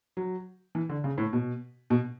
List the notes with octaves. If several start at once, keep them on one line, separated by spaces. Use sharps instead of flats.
F#3
E3
D3
C#3
A2
B2
B2